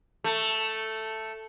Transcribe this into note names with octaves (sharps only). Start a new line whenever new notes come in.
A3